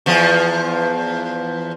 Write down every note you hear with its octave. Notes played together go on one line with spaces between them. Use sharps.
E2 F3